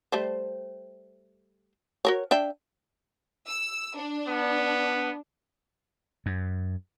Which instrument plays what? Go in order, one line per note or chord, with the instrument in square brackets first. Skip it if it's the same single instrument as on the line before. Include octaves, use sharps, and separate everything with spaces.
[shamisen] G3 A3 C5
F#4 A#4 C#5
D4 E5 G5
[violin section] E6
D4
[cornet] B3
[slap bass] F#2